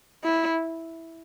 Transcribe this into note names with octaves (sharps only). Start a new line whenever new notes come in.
E4